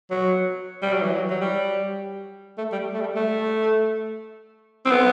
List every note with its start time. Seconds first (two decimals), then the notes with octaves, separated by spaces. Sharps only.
0.10 F#3
0.82 G3
0.93 F#3
1.02 E3
1.11 F#3
1.30 F#3
1.41 G3
2.58 A3
2.72 G3
2.94 A3
3.01 G3
3.16 A3
4.85 C4
4.91 B3